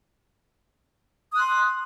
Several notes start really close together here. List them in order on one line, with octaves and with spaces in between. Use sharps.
D#6 F#6 C6